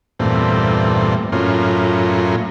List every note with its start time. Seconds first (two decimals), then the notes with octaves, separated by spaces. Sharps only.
0.19 E2 G2 A#2 A3 C4
1.32 F#2 A2 A#3 C#4 F4